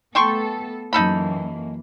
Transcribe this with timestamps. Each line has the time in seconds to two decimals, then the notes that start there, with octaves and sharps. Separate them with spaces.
0.15 A3 B3 A4 G5 C6 C#6
0.93 F#2 E3 A#3 D#4 A4 B5